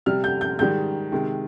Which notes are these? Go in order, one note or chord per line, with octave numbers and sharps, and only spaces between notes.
C3 G3 F6
G6
G6
G#2 D#3 G3 G6
C3 D#3 G#3